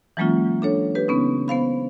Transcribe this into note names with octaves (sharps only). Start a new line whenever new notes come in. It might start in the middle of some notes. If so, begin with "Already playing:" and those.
E3 F#3 G#3 A#3 C#4 F4
D4 A4 C#5
G4 B4
C#3 B3 C#4 D#4
B3 C5 F5 B5